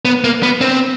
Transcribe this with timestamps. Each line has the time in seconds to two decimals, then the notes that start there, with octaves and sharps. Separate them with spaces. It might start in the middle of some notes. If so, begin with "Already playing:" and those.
0.05 B3
0.24 A#3
0.43 B3
0.61 C4